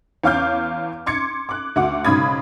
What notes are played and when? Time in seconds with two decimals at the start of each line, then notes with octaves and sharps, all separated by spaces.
0.24 E2 C#5 F5 D6 F6 G6
1.06 C6 D6 G#6 C#7
1.49 D6 F#6
1.76 D2 F#4 F#5 D6
2.05 B1 G#2 C#3 B5 D#6 G#6